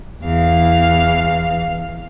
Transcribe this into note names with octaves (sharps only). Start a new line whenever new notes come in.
E2 F5